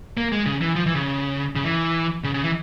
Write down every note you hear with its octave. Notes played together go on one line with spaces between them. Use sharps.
A#3
G#3
C#3
E3
F3
E3
C#3
C#3
E3
C#3
C#3
E3